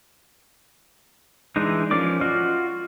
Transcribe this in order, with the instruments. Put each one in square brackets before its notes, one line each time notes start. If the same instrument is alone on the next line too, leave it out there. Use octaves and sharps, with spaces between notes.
[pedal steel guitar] E3 G#3 D4 D#4
F3 C#4 A#4 D5 D6
F4 F#4 D#5 F6